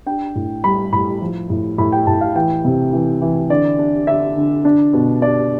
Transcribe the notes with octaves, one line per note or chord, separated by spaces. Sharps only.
D4 G5
A2
G3 B5
A2 B5
F3
A2
A2 B5
G5
A2 A5
F5
E3 G5
C3
E3
E3
D3 D5
D4
D3 E5
D3
D4
B2
D4 D5